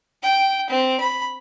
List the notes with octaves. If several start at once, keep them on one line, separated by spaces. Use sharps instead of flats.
G5
C4
B5